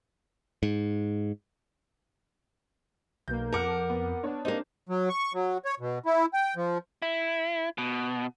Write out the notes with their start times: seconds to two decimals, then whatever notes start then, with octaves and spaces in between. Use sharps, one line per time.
0.63 G#2
3.28 B1 A#3 G6
3.52 F2 A#4 F#5 A5 D6 F6
3.90 B3
4.23 B3 D4 C#5
4.45 A#3 C4 D#4 G4
4.89 F#3
5.09 C#6
5.34 F#3
5.65 C#5
5.80 B2
6.06 E4
6.34 G5
6.56 F3
7.02 E4
7.78 B2